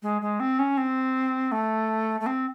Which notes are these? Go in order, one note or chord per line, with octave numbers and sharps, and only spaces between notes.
G#3
G#3
C4
C#4
C4
A3
A3
C4